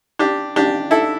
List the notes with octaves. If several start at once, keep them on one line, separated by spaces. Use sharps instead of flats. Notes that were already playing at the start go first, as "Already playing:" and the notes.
D4 G4
D4 G4
E4 A4